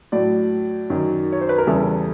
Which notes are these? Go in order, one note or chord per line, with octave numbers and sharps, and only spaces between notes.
A2 F#3 D5
F#2 D#3 F#3
C#5
C5
B4
A#4
E2 C#3 E3 G3 A4